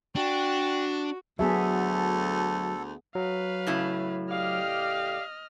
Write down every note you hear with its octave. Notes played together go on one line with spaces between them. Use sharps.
D4 F#4 G5
D2 F#3 B3 G#4 A4 E5
F#3 B4 F5
A2 C#3 E4
G4 D5 D#5 F5 F6